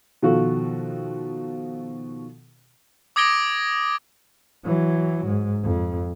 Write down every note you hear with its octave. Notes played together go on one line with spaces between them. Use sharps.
B2 D#3 F3 F4 F#4 A4
D6 D#6 G#6 A#6 D7 G7
E3 F#3
G#2
F2